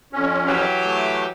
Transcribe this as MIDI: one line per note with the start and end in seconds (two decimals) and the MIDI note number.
0.13 0.65 41
0.13 0.65 61
0.47 1.27 52
0.47 1.27 54
0.47 1.27 67
0.85 1.25 57